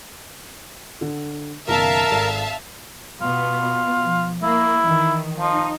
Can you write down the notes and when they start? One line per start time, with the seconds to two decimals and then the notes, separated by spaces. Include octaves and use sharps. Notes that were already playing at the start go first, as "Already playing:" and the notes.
1.01 D3
1.68 F#1 B2 D#3 A#4 E5 F5 A5
2.11 G#1 A4
3.21 B2 B3 F4
4.03 F3
4.43 A#3 E4
4.86 D#3 E3
5.39 F3 D#4